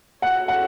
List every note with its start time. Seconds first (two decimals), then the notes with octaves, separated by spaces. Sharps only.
0.22 C#4 F#4 A4 C#5 F#5
0.48 F#5